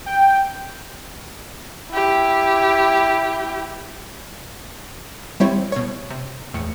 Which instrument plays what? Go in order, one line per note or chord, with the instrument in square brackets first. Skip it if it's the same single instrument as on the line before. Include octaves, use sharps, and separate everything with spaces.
[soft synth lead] G5
[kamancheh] E4 G4
[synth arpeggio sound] G3 C4 E4 C#5
B2 C#5
C3
E2 A2 C#7